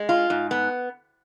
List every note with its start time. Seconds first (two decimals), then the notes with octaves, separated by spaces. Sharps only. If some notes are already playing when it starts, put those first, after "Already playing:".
Already playing: G#3
0.09 F4
0.30 G#2
0.51 B3